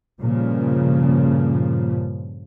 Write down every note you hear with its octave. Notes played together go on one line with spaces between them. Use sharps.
G2 A#2 C#3 F3